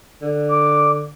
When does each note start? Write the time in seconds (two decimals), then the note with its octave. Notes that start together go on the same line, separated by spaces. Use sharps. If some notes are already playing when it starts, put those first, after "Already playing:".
0.22 D3
0.49 D6